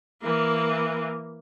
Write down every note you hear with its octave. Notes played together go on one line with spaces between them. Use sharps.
E3 A#3